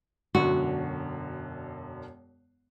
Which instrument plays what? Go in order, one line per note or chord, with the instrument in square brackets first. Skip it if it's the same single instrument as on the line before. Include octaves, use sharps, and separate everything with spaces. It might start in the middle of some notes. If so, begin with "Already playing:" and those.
[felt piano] E1 F#2 D3 [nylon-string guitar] F#4